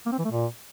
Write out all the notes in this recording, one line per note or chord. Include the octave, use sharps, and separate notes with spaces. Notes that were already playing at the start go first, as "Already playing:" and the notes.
A#3
C4
E3
A3
A#2